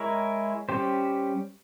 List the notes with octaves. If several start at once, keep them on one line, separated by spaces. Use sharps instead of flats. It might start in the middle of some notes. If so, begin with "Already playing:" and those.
Already playing: G#3 E4 A#4 C#5
G3 C#4 G4 C5